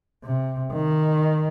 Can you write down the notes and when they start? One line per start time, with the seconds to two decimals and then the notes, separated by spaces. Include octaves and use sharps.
0.24 C3
0.72 D#3